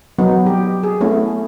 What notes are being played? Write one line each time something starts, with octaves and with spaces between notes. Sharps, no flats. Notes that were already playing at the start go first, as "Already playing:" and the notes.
F#3 B3 D#4
G3 G4
G#4
A3 B3 C#4 E4